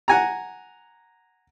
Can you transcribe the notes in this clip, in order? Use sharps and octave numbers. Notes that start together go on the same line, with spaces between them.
F#5 G#5 A#5